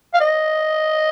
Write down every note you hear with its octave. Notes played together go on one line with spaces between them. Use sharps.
F5
D#5